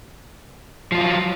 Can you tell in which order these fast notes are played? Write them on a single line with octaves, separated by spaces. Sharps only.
F3 F4 F#3